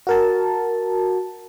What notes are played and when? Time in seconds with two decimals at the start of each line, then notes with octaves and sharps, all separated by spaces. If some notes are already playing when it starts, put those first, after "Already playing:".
0.07 F#4 A#4 A5